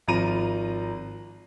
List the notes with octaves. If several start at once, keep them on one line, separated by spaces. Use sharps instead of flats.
G#1 F3 A#5 D#7